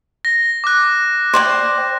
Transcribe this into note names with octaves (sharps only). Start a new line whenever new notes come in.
A#6
D6 F#6
C5 D5 G5